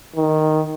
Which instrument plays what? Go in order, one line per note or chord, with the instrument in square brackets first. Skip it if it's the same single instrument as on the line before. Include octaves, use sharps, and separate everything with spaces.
[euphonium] D#3